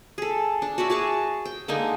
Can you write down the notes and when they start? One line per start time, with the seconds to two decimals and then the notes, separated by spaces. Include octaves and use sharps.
0.18 G#4 A4
0.62 D4
0.78 F#4 C#5 D5 E5
0.90 F#4 G#4 A5 C#6
1.45 G5
1.68 D3 G#3 A#3 D#4